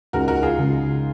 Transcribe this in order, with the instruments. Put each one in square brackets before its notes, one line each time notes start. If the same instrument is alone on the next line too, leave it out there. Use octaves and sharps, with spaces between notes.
[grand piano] C#2 C#3 G#3 D#4 [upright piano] F#4 A#4
[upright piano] F#4 A#4
F4 G#4
[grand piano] C#2 C#3 G#3 D#4